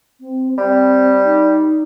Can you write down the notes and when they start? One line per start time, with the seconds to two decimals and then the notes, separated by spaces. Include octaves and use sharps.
0.20 C4
0.58 G3 C4
1.24 D#4